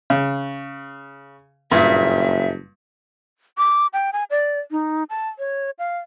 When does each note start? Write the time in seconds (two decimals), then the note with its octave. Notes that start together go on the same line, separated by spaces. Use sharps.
0.10 C#3
1.71 F#1 G2 A#2 E5
3.58 D6
3.93 G5
4.13 G#5
4.31 D5
4.71 D#4
5.10 A5
5.39 C#5
5.79 F5